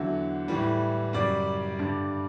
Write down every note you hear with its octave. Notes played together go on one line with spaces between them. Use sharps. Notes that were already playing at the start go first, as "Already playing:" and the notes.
Already playing: E2 D3 F#3 E5
A2 E3 G3
F#2 C#3 G3 D5
G2 D3 G3